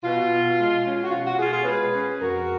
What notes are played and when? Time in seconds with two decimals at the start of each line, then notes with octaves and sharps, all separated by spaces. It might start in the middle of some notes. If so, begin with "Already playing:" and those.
0.03 B2 F4
0.31 B2
0.58 G#3
0.84 C#4
1.04 F#4
1.11 B2 F4
1.25 F#4
1.39 B2 F4 G#4
1.52 F4 G#4
1.61 C#5
1.65 G#3 G#4 B4
1.93 C#4
2.20 F2 F#4 A#4